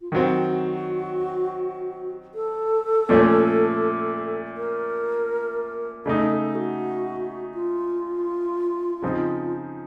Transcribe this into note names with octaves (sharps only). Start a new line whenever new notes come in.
F4
D#3 F#3 C4 F#4
A4
A#2 F3 A3 C#4
A#4
C#3 A3 D#4 A4
A4
F#4
F4
C#3 F3 C4 D#4